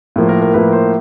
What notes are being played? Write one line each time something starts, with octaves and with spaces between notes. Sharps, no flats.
A2 F3 A#3
A#4
A#4
A2 F3 A#3 B4
C5